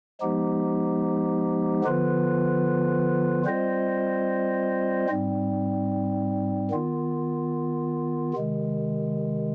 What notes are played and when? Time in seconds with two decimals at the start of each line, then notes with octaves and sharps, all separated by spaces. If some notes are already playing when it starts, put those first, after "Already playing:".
0.21 F3 G#3 B3 D#4 G4
1.84 D3 F3 B3 F4 B4
3.46 G3 C4 F4 C5 D#5
5.09 G#2 G3 C4
6.71 D#3 B3 F4
8.34 C3 D#3 G#3